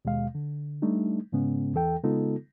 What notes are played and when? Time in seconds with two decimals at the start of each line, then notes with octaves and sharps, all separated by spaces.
0.05 D#2 B2 G#3 F5
0.35 D3
0.82 G3 A3 D4 D#4
1.32 G#2 C#3 G#3 B3 C#4
1.74 E2 E3 A4 G5
2.04 C#3 G#3 B3 D#4 F4 A4